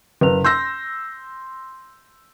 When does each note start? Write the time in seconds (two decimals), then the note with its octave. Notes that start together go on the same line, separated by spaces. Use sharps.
0.21 F#1 B4 F7
0.44 C6 E6 G6 A#6